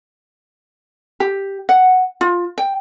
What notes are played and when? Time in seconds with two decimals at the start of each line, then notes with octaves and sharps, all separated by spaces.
1.20 G4
1.69 F#5
2.21 F4
2.58 G5